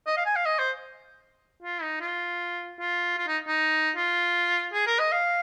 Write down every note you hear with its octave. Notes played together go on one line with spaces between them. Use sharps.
D#5
F5
G#5
F5
D#5
C5
F4
D#4
F4
F4
F4
D#4
D#4
F4
G#4
A#4
D#5
F5